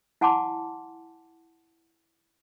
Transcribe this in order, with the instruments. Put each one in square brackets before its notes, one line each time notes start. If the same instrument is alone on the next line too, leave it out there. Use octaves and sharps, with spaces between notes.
[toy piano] E4 F#5 G#5 A5 C6 D6